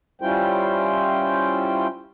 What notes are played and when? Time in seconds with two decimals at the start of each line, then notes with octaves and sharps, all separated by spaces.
0.21 G3 C#4 E4 F4 C5 G5